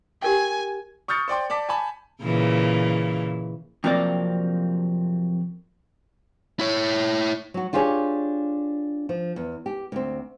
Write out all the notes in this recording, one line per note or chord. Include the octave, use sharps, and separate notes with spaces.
G4 A#4 G5 G#5
C#6 D#6 F6 G6 A6 C#7
C5 D5 G5 C6
D5 A5 D6 B6
G#5 A5 B5
A#2 C#3 E3
F2 C3 F#3 A#3 C4 D5
E4 C#5
F#3 F#4
D4 F4 G4 G#4 C#5
F3
E2
G4
D2 C4